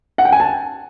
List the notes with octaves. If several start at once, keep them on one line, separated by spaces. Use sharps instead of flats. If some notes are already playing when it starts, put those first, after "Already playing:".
F#5
G5
G#5
A5